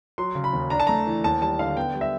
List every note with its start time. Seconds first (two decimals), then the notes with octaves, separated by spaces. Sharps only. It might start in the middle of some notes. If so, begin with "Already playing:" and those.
0.18 F#3 C6
0.35 C#3
0.44 B5
0.53 D#2
0.70 D4 A#5
0.80 A5
0.87 A3 A#5
1.07 E3
1.24 D#2 A5
1.41 G3 A5
1.59 D3 F5
1.77 B3 G5
1.95 G3
2.01 E5